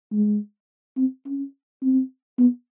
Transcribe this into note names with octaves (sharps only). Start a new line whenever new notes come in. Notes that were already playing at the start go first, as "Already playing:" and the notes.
G#3
C4
C#4
C4
B3